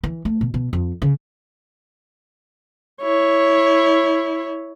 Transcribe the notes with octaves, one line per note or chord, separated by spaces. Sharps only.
E3
A3
B2
B2
F2
C#3
E4 C#5